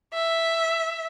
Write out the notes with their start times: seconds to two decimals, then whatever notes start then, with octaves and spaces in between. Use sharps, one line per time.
0.14 E5